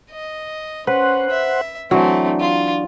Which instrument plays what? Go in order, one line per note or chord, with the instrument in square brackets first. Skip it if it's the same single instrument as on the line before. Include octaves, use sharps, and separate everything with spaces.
[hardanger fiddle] D#5
[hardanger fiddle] C#4 [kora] B4 [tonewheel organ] C5 F#5
[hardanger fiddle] E5
[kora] E3 F#3 [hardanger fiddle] A3 C4 [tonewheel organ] D4
[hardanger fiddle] F4